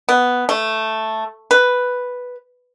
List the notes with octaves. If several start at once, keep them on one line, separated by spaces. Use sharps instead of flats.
B3
A3
B4